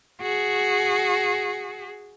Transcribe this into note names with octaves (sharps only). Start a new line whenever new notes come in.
F#4 G#4